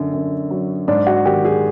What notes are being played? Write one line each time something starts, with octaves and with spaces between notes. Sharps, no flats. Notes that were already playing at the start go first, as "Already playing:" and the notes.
Already playing: F#2 D3
F#2
F#3
G#2 D4
F#4
D#3 G4
G#4